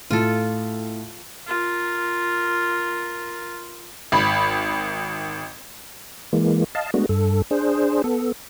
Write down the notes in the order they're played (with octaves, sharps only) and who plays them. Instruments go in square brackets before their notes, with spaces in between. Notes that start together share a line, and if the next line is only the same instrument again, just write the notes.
[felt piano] A2 [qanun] F4 A4
[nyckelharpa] F4 A#4
[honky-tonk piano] G#1 B5
[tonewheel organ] E3 G#3 A#3
D#5 F5 A5
G#3 A3 B3 D4 F#4
G2 A4
D4 G#4 C5
B3 A4